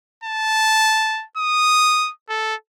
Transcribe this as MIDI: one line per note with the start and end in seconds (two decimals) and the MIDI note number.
0.24 1.24 81
1.38 2.11 87
2.29 2.55 69